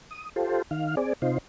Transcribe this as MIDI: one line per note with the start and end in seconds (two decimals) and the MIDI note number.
0.11 0.29 87
0.36 0.62 65
0.36 0.62 67
0.36 0.62 69
0.36 0.62 72
0.71 0.95 51
0.71 0.95 77
0.97 1.13 60
0.97 1.13 68
0.97 1.13 74
1.22 1.38 48
1.22 1.38 63
1.22 1.38 65
1.22 1.38 72